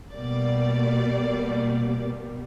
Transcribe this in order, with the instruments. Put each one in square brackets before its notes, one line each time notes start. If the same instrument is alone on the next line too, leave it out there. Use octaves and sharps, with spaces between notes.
[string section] B2 G3 A#3 D5